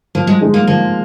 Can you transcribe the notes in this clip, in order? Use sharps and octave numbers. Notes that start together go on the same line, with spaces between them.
F3 A#3
G#3
G#3 D#4 G#4
A#3
F3 A#3